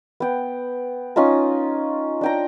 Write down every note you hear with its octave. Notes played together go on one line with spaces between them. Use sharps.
B3 G5
C#4 D#4 F4 A#5
D4 G5 A#5